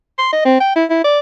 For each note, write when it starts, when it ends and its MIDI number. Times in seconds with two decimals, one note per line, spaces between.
0.18 0.31 84
0.33 0.41 75
0.45 0.58 60
0.60 0.72 79
0.76 0.85 64
0.90 1.01 64
1.04 1.20 74